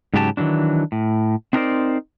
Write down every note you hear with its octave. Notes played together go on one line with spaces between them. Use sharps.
G#2 C#3 F#3 G4 A4 A5
D#3 E3 F#3 D4
A2
C4 D4 D#4 A#4 C5 D5